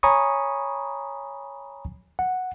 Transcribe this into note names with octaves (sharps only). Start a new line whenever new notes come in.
C#5 G#5 A#5 B5 C#6 D#6
F#5